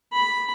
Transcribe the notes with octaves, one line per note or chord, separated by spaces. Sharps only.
B5